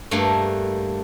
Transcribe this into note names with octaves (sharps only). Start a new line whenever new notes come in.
G2 A3 A#3